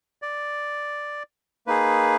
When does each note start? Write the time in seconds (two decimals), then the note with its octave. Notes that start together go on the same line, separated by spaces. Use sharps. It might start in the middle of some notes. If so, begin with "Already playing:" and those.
0.22 D5
1.67 A#3 D#4 G#4 B4